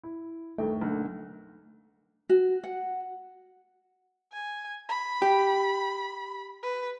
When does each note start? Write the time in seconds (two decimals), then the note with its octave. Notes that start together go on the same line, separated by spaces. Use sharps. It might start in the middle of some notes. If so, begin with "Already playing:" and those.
0.03 E4
0.58 G1 D#2 A3 G5
0.81 B1 D3 A#3
2.29 F#4
2.64 F#5
4.32 G#5
4.89 B5
5.22 G4
6.62 B4